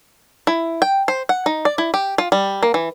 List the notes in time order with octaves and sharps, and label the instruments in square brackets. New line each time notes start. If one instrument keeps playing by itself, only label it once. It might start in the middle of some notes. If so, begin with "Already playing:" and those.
[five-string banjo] E4
G5
C5
F#5
D#4
D5
E4
G4
F4
G3
A#3
E3